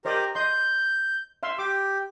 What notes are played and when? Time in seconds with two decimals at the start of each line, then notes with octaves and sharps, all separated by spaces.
0.05 G4 A#4 C5 D5 D#5 A#5
0.35 D#5 C6 G6
1.43 E5 F5 C6
1.59 G4 D6